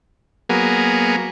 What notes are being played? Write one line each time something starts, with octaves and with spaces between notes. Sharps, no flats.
F#3 A#3 B3 G#4